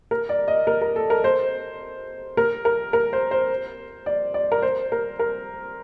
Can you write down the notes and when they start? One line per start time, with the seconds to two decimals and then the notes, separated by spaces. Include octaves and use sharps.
0.11 A#4
0.29 D5
0.48 D#5
0.67 A#4
0.82 A#4
0.96 A4
1.10 A#4
1.24 C5
2.37 A#4
2.65 A#4
2.93 A#4
3.13 C5
3.31 C5
4.06 D5
4.34 D5
4.52 A#4
4.62 C5
4.92 A#4
5.19 A#4